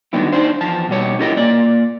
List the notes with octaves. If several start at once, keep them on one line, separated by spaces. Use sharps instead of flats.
D3 D#3 F#3 G3 B3 E4
D4 D#4 C5
E2 F3 A5
B2 G3 C#5
C#4 E4 F4 G4 A#4 D#5
A#2 A#3 F4 D5